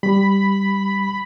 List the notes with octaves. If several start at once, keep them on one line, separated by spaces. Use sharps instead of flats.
G3 B5